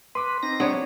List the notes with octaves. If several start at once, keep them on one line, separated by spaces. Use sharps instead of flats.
B4 C6 D6
C4 D#4 A#6
B3 D4 C#5